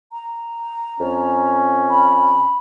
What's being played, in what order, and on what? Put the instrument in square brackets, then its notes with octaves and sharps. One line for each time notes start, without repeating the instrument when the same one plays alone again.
[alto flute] A#5
[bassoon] F2 [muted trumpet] C#4
[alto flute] B5